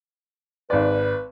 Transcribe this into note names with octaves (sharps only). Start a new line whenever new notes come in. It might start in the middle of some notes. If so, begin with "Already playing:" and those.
G#1 B4 D5